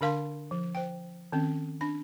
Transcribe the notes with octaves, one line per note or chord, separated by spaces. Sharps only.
D3 D4 A#4 F5 A5 C6
F3
C5 G5
D#3 C4 C#4
D4 B5